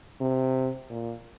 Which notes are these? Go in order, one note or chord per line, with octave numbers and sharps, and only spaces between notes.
C3
A#2